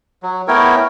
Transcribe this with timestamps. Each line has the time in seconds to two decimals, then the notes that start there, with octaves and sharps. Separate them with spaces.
0.23 F#3
0.48 A3 B3 E4 A#4 C#5 G5